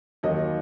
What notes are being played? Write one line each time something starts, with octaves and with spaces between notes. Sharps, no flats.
D#2 D#3 F#3 D#5